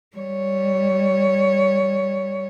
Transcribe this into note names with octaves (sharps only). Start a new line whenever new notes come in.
G3 C#5